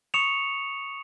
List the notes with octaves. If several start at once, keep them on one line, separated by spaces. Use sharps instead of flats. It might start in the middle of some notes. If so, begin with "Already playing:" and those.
C#6 D#6 C#7 E7 F7